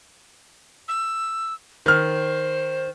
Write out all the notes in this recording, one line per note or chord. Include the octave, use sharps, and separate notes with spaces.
E6
D#3 C5 F6